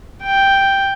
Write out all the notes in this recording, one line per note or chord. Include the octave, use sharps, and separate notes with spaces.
G5